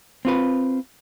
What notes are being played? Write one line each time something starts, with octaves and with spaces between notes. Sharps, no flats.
C4 F4 B4